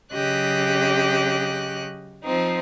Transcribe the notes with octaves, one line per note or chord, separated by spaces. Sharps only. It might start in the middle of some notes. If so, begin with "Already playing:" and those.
C#3 F#3 G4 D#5 F#6
F3 C4 D#4